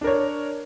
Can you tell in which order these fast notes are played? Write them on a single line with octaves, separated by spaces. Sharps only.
D4 A#4 C#5